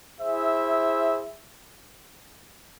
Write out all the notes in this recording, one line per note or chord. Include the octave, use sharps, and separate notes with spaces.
E4 G#4 C5 E5